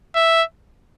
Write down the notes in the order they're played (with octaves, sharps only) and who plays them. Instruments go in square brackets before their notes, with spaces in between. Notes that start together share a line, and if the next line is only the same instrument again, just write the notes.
[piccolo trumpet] E5